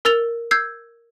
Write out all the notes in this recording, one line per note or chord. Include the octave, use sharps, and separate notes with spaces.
A#4 E6 A6 F7 G7
E6 G6 G#6 C7